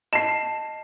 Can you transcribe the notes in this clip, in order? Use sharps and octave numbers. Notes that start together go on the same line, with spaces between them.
D#5 A5 C7 E7